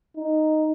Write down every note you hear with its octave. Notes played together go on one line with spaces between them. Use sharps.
D#4